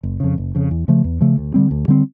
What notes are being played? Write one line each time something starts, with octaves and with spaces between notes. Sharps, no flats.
F#1
F2 C#3
F#1
F2 C#3
E2
C#3 F3 A3
E2
C#3 F3 A3
D2
D3 G3 C4
D2
D3 G3 C4